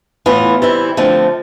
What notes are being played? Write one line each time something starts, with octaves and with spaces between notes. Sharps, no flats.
A2 E3 B3 F4
E3 G3 C4 E4
D3 F3 A3 C4